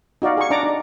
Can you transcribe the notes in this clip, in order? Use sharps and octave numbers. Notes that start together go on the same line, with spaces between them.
D#4 F#4 D5 F5
G#4 C#6
D4 D5 A#5 D6
D#4